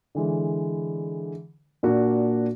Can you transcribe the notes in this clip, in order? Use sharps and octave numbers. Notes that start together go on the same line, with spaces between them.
D3 E3 G#3
A#2 A#3 D4 F#4